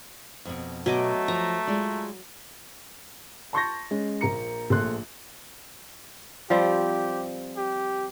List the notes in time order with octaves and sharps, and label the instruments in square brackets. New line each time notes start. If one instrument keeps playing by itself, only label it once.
[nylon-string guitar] F2 B2
[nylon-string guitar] B2 [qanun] F#3 D#5 D6 [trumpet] A3
[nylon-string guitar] F3 [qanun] A#5
[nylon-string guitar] G#3 F4 D5
[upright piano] A5 C6 C#6 G6 A6 A#6
G#3 C#4
A#1 A#3 A#5 C#7
A#1 A3 C6 F#6
[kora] F3 G3 C4 [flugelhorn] G4
[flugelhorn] G4